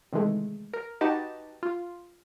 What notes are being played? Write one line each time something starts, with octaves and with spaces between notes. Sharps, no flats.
C3 D#3 E3 G#3 A3
A#4
D#4 F#4 G4 B4 D#5 A5
F4